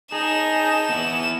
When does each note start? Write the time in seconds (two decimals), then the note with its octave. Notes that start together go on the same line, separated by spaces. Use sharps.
0.12 D#4 G#4 A5 E7
0.89 B3 E4